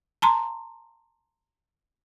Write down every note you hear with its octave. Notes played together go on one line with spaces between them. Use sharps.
A5 A#5 C6